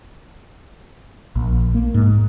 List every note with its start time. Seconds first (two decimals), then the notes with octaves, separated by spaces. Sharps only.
1.36 A#1
1.75 A#3
1.94 G#2